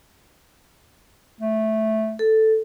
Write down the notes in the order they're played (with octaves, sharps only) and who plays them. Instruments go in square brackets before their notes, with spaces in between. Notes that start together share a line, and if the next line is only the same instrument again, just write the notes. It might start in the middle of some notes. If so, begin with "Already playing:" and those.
[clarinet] A3
[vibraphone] A4